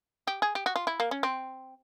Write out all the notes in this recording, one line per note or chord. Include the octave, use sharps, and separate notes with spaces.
G4
G#4
G4
F#4
F4
E4
A#3
C#4
C4